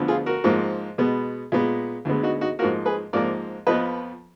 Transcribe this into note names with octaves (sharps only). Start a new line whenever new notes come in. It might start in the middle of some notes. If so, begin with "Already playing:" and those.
Already playing: D2 D3 F3 B3
F4 G#4
F#4 A#4
G#2 F3 A#3
B2 G#3 B3
A#2 G#3 B3
D2 D3 G#3 B3
D#4 F#4
D#4 F#4
G#2 F3 A#3 F#4 A#4
G#4 B4
G#2 F3 A#3 A#4 D5
F2 F3 B3 B4 D#5